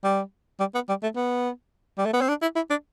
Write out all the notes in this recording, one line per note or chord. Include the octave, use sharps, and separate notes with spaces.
G3
G3
B3
G3
A3
B3
G3
A3
B3
C4
D4
E4
E4
D4